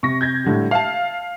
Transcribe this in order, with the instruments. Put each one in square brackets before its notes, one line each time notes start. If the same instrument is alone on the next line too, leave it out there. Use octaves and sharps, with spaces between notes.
[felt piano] C3 [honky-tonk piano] C#6 A#6
[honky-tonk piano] G6 G#6 A#6
[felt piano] A2 D3 G3
[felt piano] E5 A5 [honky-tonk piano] F5